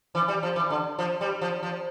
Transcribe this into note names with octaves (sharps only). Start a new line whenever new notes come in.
E3
G3
F3
E3
D3
F3
G3
F3
F3